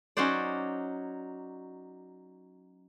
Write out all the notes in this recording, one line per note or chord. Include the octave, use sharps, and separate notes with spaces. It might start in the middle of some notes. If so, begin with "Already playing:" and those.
F#3 C#4 D#4 F#4 C5 D5